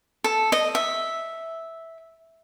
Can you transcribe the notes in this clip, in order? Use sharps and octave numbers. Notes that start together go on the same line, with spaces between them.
A4
D#5
E5